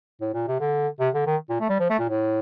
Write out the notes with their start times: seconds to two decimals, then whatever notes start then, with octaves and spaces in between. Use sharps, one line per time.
0.21 A2
0.34 A#2
0.48 C3
0.60 D3
1.00 C3
1.14 D3
1.27 D#3
1.50 A#2
1.60 A3
1.69 G3
1.80 F3
1.90 A3
1.99 A#2
2.09 A2